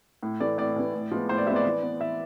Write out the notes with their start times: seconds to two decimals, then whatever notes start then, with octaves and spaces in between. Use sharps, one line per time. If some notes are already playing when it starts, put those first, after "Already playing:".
0.23 A2
0.40 E3 A3 D5
0.58 A2 D5
0.76 E3 A3
0.94 A2
1.11 F3 G#3 B3
1.29 A2 C5
1.38 D5
1.47 F3 G#3 B3 E5
1.56 D5
1.65 E3
1.83 B3
2.00 E3 E5